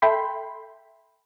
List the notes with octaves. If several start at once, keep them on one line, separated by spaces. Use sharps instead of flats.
A4 E5 G5 B5 C6